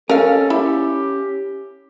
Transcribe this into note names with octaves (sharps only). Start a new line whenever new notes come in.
C#4 A4 A#4 F5
E4 G4